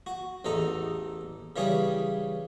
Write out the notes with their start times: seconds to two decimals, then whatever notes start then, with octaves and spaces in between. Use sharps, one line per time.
0.06 F#4
0.45 A1 E2 D#4 A4 A#5
1.56 C#3 E3 G3 C#4 G#4